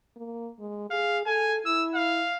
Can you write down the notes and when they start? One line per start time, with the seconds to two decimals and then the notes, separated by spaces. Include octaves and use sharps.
0.16 A#3
0.59 G#3
0.90 G#4 F5
1.26 A4 G#5
1.66 E4 E6
1.95 F5